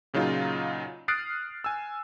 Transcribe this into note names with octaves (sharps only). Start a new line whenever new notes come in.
A#2 C#3 F#3 D#4 F4
D#6 F6 F#6 A6 C7 D7
G#5 E6